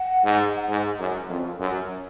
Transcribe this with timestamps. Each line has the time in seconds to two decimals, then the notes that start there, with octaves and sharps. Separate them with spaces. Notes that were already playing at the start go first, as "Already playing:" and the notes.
Already playing: F#5
0.24 G#2
0.69 G#2
0.99 F#2
1.30 F2
1.59 F#2